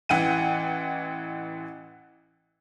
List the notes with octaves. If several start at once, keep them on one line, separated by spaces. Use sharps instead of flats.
A1 E3 F#5 G5 D#7